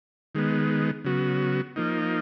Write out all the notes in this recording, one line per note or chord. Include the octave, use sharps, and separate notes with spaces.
D#3 G#3 B3
C#3 F#3 B3 F#4
F3 A#3 D#4